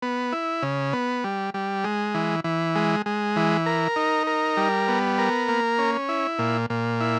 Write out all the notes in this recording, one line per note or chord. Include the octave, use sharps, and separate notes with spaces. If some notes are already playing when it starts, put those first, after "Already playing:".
B3
E4
C#3
B3
G3
G3
G#3
E3
E3
G#3
G#3
E3
A#4
D#4
A#4
G3
B3
A#4
A#3
C#4
E4
A#2
A#2
E4